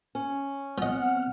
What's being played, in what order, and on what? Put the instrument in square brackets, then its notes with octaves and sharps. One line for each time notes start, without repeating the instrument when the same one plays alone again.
[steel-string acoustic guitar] C#4
[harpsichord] F3 D#5 [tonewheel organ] B3 C4 F6 [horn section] F#5